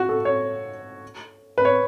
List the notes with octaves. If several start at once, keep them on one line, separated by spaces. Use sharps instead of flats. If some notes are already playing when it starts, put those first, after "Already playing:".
Already playing: F#4
A4
C#5
B4
C#5